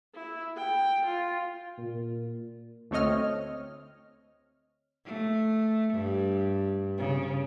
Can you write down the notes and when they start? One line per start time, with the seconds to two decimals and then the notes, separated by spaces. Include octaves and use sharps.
0.15 E4
0.57 G5
1.06 F4
1.78 A#2
2.91 D2 A3 C4 C#5 D#5 F6
5.06 A3
5.94 G2
6.98 C#3